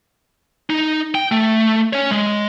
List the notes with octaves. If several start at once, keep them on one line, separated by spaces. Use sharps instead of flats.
D#4
G5
A3
C#4 C#5
G#3